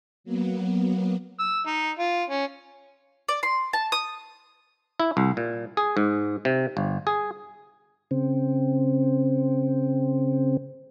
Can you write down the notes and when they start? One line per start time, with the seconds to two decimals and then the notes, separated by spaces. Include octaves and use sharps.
0.24 F#3 A#3 B3
1.40 E6
1.67 D#4
1.99 F4
2.30 C#4
3.28 D5
3.43 C6
3.73 A5
3.92 D#6
5.00 E4
5.17 C2
5.37 A#2
5.77 G#4
5.97 G#2
6.45 C3
6.77 G1
7.07 G#4
8.11 C#3 C4